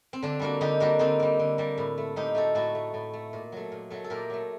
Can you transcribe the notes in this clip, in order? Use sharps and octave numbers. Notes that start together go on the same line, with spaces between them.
C4
D3 D4
G3 A#3 D4 F#4
D3 D#4 G4
G3 A#3 D4 F#4
D3 C4 D#4
G3 A#3
D3
G3 A#3
A2
A3
A2 D#4 G4
A3 F#4 A4
A2 F#4 A4
A3
A2
A3
A#2
F#3 A3
A#2
F#3 A3
A4
A#2 G4 A#4
F#3 A3